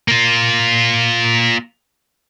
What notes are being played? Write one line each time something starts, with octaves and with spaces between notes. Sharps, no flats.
A#3 F4